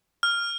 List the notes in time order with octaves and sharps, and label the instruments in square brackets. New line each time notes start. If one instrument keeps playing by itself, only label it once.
[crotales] F6